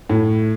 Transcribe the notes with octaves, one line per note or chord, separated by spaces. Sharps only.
A2